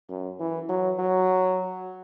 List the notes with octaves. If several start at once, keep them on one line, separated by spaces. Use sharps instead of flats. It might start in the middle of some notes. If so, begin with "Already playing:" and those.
F#2
E3
F#3
F#3